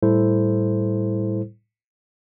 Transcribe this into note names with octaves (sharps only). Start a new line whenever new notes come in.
A2 G3 E4 A4 C5